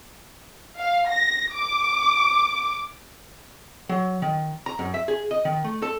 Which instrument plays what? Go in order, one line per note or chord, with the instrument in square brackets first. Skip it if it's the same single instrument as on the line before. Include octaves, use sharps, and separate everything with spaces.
[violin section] F5
A#6
D6
[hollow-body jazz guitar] F#3
D#3
A#5
F#2
E5
G#4
D#5
D#3
A3
A4